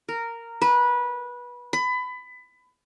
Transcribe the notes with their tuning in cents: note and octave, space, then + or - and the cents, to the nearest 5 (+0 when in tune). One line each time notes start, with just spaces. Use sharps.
A#4 -10
B4 -20
B5 +25